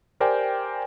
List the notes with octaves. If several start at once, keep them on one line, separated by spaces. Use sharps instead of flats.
G4 A#4 C5 D5 G5 G#5